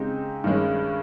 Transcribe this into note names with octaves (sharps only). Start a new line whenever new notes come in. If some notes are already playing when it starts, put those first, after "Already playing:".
Already playing: C#3 G#3 C4 D#4 G4
G2 D#3 G#3 C#4